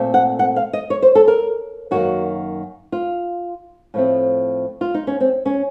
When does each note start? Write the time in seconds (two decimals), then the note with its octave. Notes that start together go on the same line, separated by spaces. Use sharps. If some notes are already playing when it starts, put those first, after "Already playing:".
Already playing: A#2 A3 C4
0.14 F#5
0.39 F#5
0.56 F5
0.73 D#5
0.90 C#5
1.02 C5
1.15 A4
1.28 A#4
1.91 F#2 D#3 A#3 F#4
2.92 F4
3.94 A2 F3 A3 C4
4.81 F4
4.94 D#4
5.07 C#4
5.20 C4
5.46 C#4